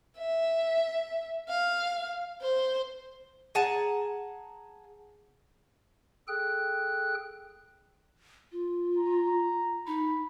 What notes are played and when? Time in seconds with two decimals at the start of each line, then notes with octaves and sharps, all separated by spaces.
0.19 E5
1.49 F5
2.42 C5
3.55 G#4 F#5 A5 A#5
6.28 G#4 A4 G5 F#6
8.52 F4
8.98 A#5
9.87 D#4 B5